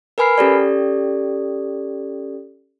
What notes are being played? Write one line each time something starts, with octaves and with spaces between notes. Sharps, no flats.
A#4 B4 G#5 B5 F6 C7
C#4 G4 A4 D5